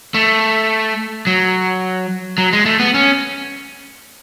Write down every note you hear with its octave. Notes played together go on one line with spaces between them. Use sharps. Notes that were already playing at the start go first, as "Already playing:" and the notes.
A3
F#3
F#3
G#3
A3
B3
C#4